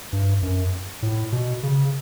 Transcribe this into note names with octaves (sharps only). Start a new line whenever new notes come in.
G2
F#2
A2
B2
C#3